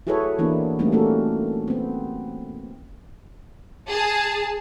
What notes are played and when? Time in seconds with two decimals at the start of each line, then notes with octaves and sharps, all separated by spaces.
0.07 E4 F#4 G#4 A4 B4 C#5
0.39 E3 A#3 B3 D4 E4
0.79 G3 A3 A#3 C4 C#4 D#4
0.92 A3 A#3 C#4 F#4 A4
1.68 B3 C4
3.88 G#4 A5